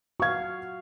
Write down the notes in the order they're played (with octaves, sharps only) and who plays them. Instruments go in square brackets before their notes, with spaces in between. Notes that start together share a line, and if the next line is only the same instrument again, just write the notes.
[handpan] F#4 F5 [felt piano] C#6 G#6